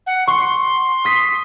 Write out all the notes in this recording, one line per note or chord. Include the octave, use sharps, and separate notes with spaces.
F#5
C6 C#6
D#6 B6 C7